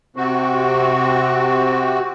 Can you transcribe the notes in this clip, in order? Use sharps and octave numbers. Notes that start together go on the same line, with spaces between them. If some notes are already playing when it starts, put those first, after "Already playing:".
C3 C4 F#4